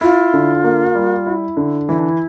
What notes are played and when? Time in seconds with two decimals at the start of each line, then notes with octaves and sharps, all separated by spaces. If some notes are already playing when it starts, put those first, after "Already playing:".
0.01 E4 F4
0.33 D3
0.64 A#3
0.95 G3
1.26 E4
1.57 D3
1.89 E3 E4
1.99 D4
2.09 E4